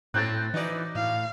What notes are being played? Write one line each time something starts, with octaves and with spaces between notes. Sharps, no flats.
A2 C4 C#4 F#6 G6 A6
E3 D#4 F#4 D5
A2 F5